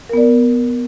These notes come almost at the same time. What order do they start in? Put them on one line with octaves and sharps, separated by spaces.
A#4 B3 D5